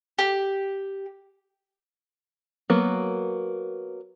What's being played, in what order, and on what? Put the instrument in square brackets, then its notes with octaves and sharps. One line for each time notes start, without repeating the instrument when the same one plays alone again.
[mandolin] G4
[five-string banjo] F#3 A#3 B3